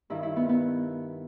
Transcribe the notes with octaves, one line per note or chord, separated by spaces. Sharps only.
G2 D#3 E4
E4
B3
B3